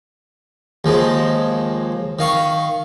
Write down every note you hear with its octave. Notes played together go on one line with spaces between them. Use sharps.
D#2 F3 G#3
D#3 F5 C#6